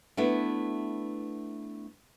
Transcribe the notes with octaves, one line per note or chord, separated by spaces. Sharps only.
A3 B3 D4 E4